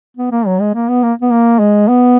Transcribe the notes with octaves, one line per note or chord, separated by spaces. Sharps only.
B3
A#3
F#3
G#3
A#3
B3
A#3
B3
A#3
G#3
B3